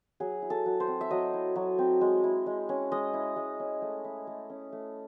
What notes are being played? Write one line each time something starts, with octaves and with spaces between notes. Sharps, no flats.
F#3 G#4
E4
A4
F#3
C5
C4
E5
F#3 D#5
E4
F#3
C4
G#3
E4
G#3
C#4
G#3 D#5
E4
G#3
C#4
A3
E4
A3
C#4
A3